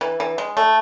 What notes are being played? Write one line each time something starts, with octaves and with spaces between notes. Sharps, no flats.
E3
E3
G#3
A3